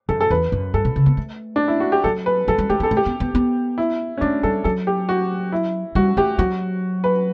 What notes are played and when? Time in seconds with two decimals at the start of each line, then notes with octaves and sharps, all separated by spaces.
0.09 F#2 A4
0.21 A4
0.30 E2 B4
0.52 F#2
0.74 G2 A4
0.85 B2
0.96 C#3
1.06 B3
1.17 A3
1.56 D4
1.68 E4
1.80 F#4
1.92 G4
2.04 F#3 A4
2.26 B4
2.48 F#3 A4
2.58 G3
2.70 A3 G4
2.80 B3 A4
2.91 A3
2.97 G4
3.06 B3
3.20 B3
3.35 B3
3.78 E4
4.17 C#4
4.21 A3 D4
4.43 G3 A4
4.64 F#3 A4
4.87 G4
5.09 F#4
5.52 E4
5.95 G3 F#4
6.17 A3 G4
6.38 F#3 F#4
7.04 B4